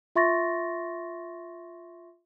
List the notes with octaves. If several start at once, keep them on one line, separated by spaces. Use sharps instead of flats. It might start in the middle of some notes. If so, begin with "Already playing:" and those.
F4 E5 C6 C#6 A6 A#6